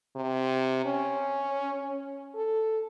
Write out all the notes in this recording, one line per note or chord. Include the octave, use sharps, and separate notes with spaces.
C3
C#4
A4